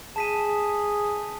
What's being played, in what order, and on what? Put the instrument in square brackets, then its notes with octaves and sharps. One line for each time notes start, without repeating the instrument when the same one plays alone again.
[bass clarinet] G#4 [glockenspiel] A5 B6 D#7